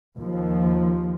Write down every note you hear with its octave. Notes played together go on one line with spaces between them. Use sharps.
D#2 F3